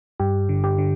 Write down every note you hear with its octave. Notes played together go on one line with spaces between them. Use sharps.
G2 G4
D3
G4
D3